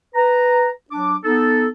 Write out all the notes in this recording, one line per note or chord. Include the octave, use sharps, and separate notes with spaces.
B4 A#5
F#3 D4 D6
B3 D#4 A4